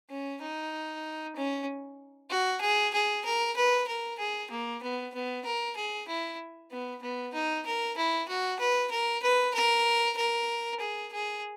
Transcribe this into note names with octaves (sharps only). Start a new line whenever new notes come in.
C#4
D#4
C#4
F#4
G#4
G#4
A#4
B4
A#4
G#4
A#3
B3
B3
A#4
G#4
E4
B3
B3
D#4
A#4
E4
F#4
B4
A#4
B4
A#4
A#4
G#4
G#4